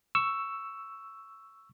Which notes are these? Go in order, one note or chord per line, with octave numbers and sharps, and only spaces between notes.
C#6 E6